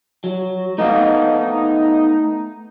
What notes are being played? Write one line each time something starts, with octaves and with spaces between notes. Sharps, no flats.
F#3
A3 B3 D#4 F5